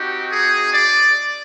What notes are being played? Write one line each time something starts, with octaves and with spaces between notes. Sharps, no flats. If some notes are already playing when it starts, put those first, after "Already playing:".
Already playing: C4 D#4 F#4 G4
G#4
D5